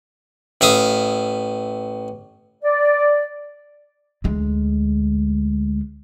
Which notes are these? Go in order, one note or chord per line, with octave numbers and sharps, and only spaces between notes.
A1 E5 F5 D#6
D5
D2 G#3